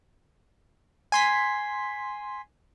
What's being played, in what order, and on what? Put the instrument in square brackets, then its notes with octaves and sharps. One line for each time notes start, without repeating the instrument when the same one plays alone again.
[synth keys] G#5 C6 B6